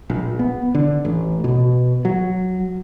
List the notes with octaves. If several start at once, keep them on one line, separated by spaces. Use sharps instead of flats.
A#1
B3
D3
A1
B2
F#3